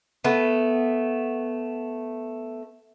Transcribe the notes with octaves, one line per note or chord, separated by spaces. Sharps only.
A3 B3